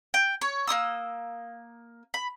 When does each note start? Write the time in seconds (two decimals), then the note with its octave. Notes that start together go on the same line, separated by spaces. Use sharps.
0.14 G5
0.41 C#5
0.67 A#3 C5 D#6 E6
2.14 B5